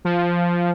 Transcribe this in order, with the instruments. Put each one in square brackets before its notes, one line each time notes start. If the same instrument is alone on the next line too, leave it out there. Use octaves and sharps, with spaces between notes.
[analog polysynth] F3